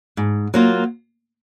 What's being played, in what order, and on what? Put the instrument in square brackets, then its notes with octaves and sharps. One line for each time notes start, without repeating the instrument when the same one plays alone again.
[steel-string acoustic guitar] G#2
F#3 A#3 F4